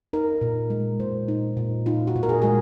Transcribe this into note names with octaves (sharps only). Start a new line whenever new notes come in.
D#4 A#4
A#2
G#3
A#2 C5
D#4
A#2
D#4 F4
F#4
A#2
A#4
G#4
G#3 G#4